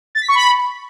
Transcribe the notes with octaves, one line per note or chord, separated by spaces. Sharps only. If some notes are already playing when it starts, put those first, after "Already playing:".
A6
B6
C#6
B5